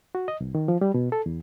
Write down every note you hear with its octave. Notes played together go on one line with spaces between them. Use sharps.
F#4
D#5
C2
D#3
F3
G3
B2
A4
E2